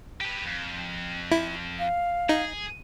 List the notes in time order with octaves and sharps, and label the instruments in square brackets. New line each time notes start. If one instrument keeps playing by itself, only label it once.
[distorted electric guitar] G4 B4
F2
[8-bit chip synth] E4
[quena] F5
[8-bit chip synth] D#4 [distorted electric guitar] G#4